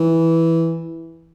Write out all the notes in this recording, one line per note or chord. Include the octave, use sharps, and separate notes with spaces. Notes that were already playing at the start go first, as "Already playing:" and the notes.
Already playing: E3